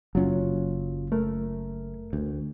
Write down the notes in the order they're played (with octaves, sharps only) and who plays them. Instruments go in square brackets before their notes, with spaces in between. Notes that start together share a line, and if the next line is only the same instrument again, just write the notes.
[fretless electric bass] F#1 C#4 [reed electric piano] F#3 F4
[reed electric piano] A3 A#4
[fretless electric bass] D2